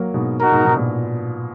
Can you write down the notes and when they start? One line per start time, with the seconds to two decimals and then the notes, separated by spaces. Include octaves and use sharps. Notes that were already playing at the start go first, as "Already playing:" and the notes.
Already playing: F#3 A#3
0.14 G#2 B2
0.39 D#4 F#4 A#4
0.52 G#2 B2
0.64 G#2 B2
0.77 A#2